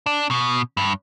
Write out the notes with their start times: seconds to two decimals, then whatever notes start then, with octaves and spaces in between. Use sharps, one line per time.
0.06 D4
0.31 B2
0.77 G2